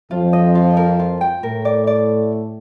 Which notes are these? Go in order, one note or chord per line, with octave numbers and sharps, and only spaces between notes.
F2 F3 F4
D#5
F4
A#4
F4
G5
A2 A3 A#4
D5
D5